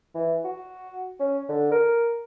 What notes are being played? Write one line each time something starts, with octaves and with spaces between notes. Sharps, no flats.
E3
F#4
C#4
D3
A#4